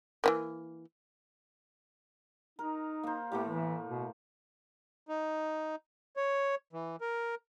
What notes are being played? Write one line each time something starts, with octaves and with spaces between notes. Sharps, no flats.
E3 F3 A#3
D#4 A#4
A#3 C5
A2 A3 A#3 G4
E3
B2
D#4
C#5
E3
A#4